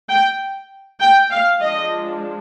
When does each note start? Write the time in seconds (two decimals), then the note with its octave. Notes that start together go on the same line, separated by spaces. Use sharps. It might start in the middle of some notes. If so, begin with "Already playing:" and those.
0.09 G5
1.00 G5
1.30 F5
1.60 F3 G#3 D4 D#5